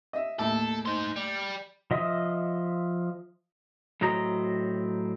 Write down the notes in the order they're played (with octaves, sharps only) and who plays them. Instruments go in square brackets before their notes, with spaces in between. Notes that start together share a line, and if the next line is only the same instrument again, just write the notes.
[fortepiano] D#5 E5
[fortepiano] D#2 A2 [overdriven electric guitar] A4
[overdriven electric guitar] D#4 C5
G3
[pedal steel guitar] F3 D#5 E5 D#6
[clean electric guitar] A2 F#3 C4 D#5 A#5